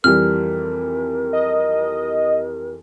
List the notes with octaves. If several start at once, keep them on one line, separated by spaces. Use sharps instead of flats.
F2 E3 G3 A#4 F6
D#5